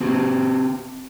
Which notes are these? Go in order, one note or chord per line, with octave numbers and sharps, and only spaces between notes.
C4 F#4 G4